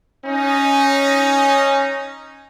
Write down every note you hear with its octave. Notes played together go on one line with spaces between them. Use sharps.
C#4 D#4